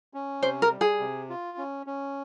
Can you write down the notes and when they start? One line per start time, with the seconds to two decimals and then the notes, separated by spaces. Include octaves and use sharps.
0.14 C#4
0.42 C3 C5
0.62 A#4
0.71 G3
0.81 G#4
1.00 C3
1.29 F4
1.58 C#4
1.86 C#4